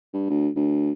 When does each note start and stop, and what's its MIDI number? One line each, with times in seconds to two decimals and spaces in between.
0.13 0.28 43
0.30 0.49 38
0.56 0.92 38